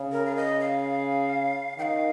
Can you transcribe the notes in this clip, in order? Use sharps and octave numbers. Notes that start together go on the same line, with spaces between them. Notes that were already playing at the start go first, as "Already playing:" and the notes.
Already playing: C#3
A#4
F5
D#5
F5
D#3 F5 G5